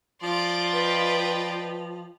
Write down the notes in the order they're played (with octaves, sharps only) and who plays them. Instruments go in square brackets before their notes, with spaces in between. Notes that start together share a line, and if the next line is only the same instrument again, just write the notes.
[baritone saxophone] F3 [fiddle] F4 D5 [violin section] C6 D7
[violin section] B4 D#5 G5